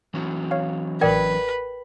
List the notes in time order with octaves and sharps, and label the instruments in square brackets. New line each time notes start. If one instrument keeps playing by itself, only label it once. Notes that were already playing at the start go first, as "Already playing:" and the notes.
[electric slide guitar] E3 F#3 C#4
[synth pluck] C#5 F5
[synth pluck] A1 D5 G#6 [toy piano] A#4 G5 [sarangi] B4